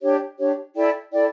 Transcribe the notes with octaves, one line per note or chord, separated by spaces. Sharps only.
D4 G4 C#5
D4 G4 C#5
E4 A4 D5 G5
E4 A4 D5 G5